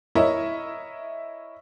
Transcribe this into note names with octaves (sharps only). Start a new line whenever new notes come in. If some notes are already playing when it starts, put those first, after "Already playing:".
E4 A#4 C#5 D#5 E5